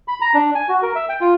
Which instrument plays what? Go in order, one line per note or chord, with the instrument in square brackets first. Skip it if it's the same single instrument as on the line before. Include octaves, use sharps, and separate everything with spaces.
[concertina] B5
A#5
D4
G#5
F#4
A#4
E5
G5
F4